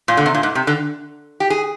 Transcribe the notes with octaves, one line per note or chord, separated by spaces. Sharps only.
A#2
D3
C3
A#2
G#2
C3
D3
G4
G#4